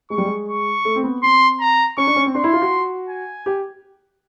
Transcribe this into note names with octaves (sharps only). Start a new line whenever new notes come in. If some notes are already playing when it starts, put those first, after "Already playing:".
G#3 C#6
G3
G#3
C#6
A3
C4
B3
C4 C6
A#5
C#4 C#6
D4
C#4
C4
D4 C6
E4
F4
F#4
G#5
G4